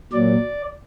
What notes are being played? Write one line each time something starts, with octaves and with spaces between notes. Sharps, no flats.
A#2 F#3 D5